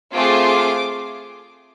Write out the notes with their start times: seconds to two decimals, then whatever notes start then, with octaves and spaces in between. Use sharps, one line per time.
0.12 A3 C4 F4 G#4 D6
0.47 D6